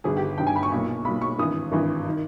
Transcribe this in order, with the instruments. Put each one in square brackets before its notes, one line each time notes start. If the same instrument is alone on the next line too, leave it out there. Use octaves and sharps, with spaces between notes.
[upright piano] G1 G2 D#3 G#4
G4
G1 G2 D#3 G5
G#5
B5
C#6
B1 A#2
B1 A#2 B5
C#6
G#1 G2 E3 D#6
G#1 G2 E3
D#3